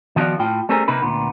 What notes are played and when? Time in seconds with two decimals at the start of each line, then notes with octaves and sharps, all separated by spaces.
0.16 D#3 F3 B3 F#4 D5 F5
0.39 A2 F4 G5
0.69 G3 A3 C4 C#4 G#4 A#4
0.88 C3 A#3 D#4 A#4 B4
1.02 D2 A#2 B3